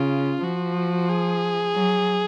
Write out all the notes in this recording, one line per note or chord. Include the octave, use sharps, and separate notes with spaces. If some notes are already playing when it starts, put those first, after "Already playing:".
Already playing: C#3 F4
F3 F#4
G#4
F#3